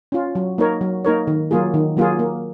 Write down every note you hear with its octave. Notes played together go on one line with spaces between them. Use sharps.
C#4 F4
F#3
A#3 D#4 A#4 C#5
F#3
A#3 D#4 A#4 C#5
D#3
F#3 A#3 F4 G#4
D#3
F#3 A#3 F4 G#4
A#3